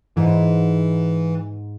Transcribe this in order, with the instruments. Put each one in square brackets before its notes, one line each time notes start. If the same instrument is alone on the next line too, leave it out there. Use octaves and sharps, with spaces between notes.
[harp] G#2 [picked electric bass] E3